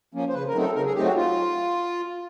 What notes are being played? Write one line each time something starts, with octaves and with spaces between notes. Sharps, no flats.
F3 A#3 C#4
C5
C#3 B4
A#4
F#3 A3 C4 D#4
A4
C#3 A#4
G#4
F#3 A3 C4 D#4 G4
F#4
F4